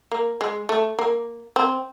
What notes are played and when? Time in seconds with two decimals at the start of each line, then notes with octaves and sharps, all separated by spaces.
0.12 A#3
0.41 G#3
0.69 A3
0.99 A#3
1.56 C4